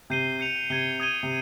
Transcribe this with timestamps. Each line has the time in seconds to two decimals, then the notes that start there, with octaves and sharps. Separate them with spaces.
0.10 C3 G6 C7 D#7 G7
0.40 G6 C#7 F7
0.70 C3 G#6 C7 D#7 G7
1.00 D#6 G#6 D#7 G7
1.23 C3